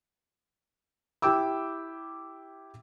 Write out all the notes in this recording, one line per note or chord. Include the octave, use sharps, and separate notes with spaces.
E4 G4 G5 D6 E6